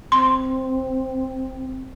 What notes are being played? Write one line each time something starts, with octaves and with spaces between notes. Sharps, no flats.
C4 C6